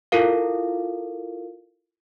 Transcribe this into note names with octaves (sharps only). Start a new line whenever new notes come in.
E4 F4 A4 A#4 F5